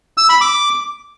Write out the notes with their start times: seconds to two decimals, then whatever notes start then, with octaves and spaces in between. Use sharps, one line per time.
0.18 E6
0.29 B5
0.41 D6